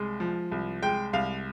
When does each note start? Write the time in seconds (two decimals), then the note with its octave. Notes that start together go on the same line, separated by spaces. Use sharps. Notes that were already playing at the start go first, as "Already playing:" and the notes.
Already playing: C2 G#3
0.20 F3
0.52 C2
0.82 G#3 G5
1.13 C2 F5